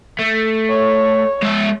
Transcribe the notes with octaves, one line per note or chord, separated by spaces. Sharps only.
A3
C#5
G#3 E5